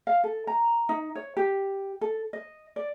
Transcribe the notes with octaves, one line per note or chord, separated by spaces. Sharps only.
F5
A4
A#5
D#4
C#5
G4
A4
D#5
D5